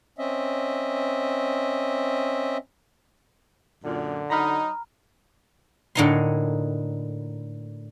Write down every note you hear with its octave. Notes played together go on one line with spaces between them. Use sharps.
C4 C#4 D#5 E5
F#2 A#2 D3
F#3 D#4 A#5 B5 F6
A2 D3 A#3 D#4 G#5 C6